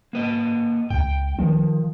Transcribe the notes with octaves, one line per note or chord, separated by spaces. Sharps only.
A#3 B4 D#5
C#2 G5
D#3 F3